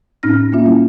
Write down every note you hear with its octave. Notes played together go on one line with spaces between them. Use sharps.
A2 C4 C#4 D#4 F6 A#6
A#3 C#4 F4 E5
G3 C#4 E4